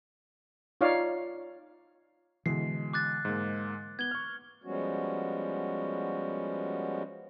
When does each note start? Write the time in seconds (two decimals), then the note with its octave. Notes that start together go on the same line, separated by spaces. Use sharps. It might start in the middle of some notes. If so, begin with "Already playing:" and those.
0.81 D#4 F4 C#5 D5 F5
2.46 B2 D3 E3 G#3 C7
2.93 D6 F#6 A6
3.25 G#2 G#3 A#3
3.99 B3 G#6 G7
4.11 C#6 F6
4.64 F3 G3 G#3 B3 C#4 F#4